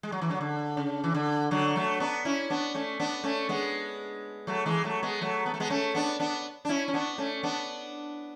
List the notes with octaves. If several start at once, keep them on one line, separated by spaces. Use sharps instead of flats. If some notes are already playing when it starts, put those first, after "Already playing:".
G#3
F#3
E3
D3 F#3
D3
C#3
E3
D3
D3 F#3
F#3 A3
B3 D4
C#4 E4
B3 D4
A3 C#4
B3 D4
A3 C#4
G#3 B3
F#3 A3
E3 G#3
F#3 A3
G#3 B3
F#3 A3
B3
A3
G#3 B3
A3 C#4
B3 D4
B3 D4
D4
C#4 E4
C#4
B3 D4
A3 C#4
B3 D4